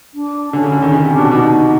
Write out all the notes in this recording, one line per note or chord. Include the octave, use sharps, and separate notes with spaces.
D4
D3 C#4
C#3
D3
D#3
C#3 C#4
C3
D4
B2
B2 D#4